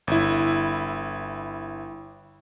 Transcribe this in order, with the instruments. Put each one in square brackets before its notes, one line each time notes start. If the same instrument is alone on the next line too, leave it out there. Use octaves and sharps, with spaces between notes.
[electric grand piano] G1 E4